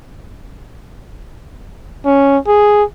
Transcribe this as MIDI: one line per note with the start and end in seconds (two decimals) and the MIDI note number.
2.05 2.37 61
2.47 2.83 68